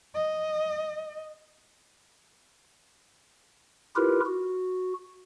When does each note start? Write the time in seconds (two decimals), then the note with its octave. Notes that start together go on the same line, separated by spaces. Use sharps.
0.14 D#5
3.96 E4 F4 G4 A#4 B4
4.26 F#4